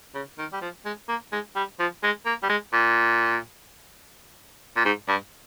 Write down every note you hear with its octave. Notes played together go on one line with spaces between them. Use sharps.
C#3
D#3
G3
F3
G#3
A#3
G#3
G3
F3
G#3
A#3
G3
G#3
A#2
A#2
G#2
G2